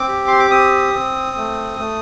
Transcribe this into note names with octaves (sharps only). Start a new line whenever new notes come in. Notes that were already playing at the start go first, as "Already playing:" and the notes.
Already playing: C4 D6
G4
C6
D6
C4 D#6
C4
A3
A3